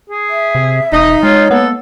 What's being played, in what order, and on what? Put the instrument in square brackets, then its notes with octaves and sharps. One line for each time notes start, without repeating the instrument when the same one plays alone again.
[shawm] G#4
[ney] E5
[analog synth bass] C3
[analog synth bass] E1 [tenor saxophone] D#4 [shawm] D#5
[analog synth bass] G#3 [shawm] F4 [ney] C#5
[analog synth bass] A#3 [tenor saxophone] B3 [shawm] A4